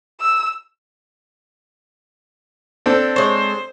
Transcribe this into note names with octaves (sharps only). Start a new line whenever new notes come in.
E6
C4 D4 A4
G#3 C5 C#5